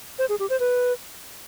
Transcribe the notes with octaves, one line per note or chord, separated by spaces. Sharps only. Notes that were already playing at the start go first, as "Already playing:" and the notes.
C5
G#4
G4
C5
B4